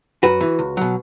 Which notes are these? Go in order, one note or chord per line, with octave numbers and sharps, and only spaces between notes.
F#2 F#4 B4
E3
C#2
B2 F#3